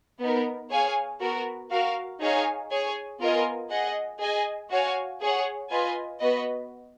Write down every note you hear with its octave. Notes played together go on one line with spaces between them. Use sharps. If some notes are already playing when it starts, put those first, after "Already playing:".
B3 D#4 A#4
G#4 C#5 F5 G#5
B3 F#4 A#4
F#4 A#4 F5
D#4 G#4 C#5 F5 G#5
G#4 C#5 G#5
B3 F4 A#4 D#5 G#5
G#4 D#5 F#5
G#4 D#5 G#5
F#4 C#5 F5 G#5
G#4 C#5 F#5
F4 B4 D#5 G#5
B3 F#4 B4 D#5